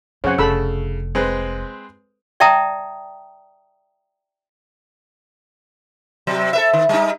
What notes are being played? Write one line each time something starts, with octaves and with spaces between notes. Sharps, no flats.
F#2 C#3 C4 C#4 C#5 F#5
F1 C#3 A4 B5 E6
G#3 C4 B4
D5 E5 G5 A5 A#5 D#6
C3 F#3
A4 B4 E5
D#3
G3 D#4